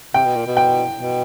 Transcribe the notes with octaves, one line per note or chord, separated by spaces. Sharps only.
C3 G5
B2
A#2
B2
G5
B2